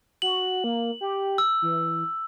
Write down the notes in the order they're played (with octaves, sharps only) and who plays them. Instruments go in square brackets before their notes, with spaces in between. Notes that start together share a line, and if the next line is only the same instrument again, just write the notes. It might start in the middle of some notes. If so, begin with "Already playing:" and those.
[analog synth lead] F#4 [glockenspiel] F#7
[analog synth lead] A#3
G4
[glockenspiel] E6
[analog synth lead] E3